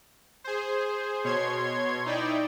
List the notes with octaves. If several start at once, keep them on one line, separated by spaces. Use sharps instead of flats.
G#4 C5
B2 C#5 C6 G#6
D#4 E4 D5 G5